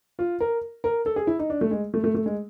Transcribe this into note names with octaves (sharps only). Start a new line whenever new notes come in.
F4
A#4
A#4
A4
G#4
E4
D#4
D4
A3
G#3
A3
A3
A3
G#3